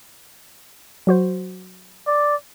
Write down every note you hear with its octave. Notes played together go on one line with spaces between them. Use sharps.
F#3 F#4 C5
D5